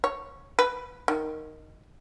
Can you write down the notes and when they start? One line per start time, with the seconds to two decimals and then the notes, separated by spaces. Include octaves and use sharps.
0.04 C#5
0.59 B4
1.08 D#3